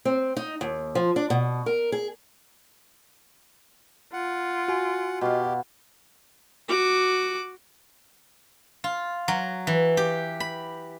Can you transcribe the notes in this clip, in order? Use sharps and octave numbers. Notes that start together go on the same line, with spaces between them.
C4
D#4
D#2
F3
D4
B2
A#4
G#4
F4 F#5
F#4 G#5
B2 G4 F5
F#4 D6
F4
F#3
E3
G4
B5